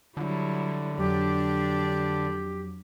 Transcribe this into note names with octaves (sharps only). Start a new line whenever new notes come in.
D3 F#3 G3 E4
F2 F#3 D4 G4 D5